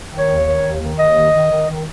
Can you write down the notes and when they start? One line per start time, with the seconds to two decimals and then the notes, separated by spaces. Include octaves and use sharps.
0.09 D#3
0.18 C#5
0.27 D#2
0.44 D#3
0.62 D#2
0.80 D#3
0.98 D#2 D#5
1.16 D#3
1.33 D#3
1.51 D#3
1.69 D#3